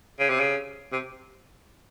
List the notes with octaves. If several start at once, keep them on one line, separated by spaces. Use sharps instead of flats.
C#3
C3
C#3
C3